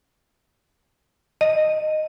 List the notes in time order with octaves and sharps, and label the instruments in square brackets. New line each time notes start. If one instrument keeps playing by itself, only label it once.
[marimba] D#5